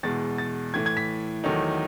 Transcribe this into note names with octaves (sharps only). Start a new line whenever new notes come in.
E2 B2 G#3 A6
A6
A2 E3 A3 G#6
G#6
B6
E2 D#3 F#3 A3 D#4